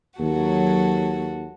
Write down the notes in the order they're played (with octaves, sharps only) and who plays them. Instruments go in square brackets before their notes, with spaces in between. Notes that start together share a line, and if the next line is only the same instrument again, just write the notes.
[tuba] D#2 [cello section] F#3 [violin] F#4 A4